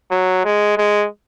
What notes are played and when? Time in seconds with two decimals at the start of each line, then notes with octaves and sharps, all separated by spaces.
0.11 F#3
0.45 G#3
0.78 G#3